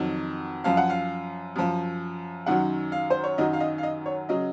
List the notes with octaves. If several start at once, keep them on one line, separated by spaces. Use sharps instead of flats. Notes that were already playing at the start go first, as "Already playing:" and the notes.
Already playing: F2 D#3 F#3
F#2 F3 F5
F#5
F5
F#2 F3
F#2 D#3 F#3 F#5
F5
C5
C#5
F#2 D#3 F#3 D#5
F5
D#5
F5
D#5
C#5
C#3 F#3 D#5